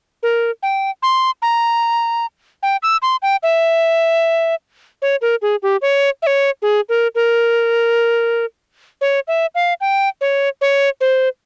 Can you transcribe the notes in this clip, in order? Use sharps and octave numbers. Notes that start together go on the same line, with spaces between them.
A#4
G5
C6
A#5
G5
E6
C6
G5
E5
C#5
A#4
G#4
G4
C#5
E5
C#5
G#4
A#4
A#4
C#5
E5
F5
G5
C#5
C#5
C5